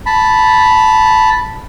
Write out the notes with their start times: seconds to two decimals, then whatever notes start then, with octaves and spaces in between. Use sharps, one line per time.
0.06 A5 B5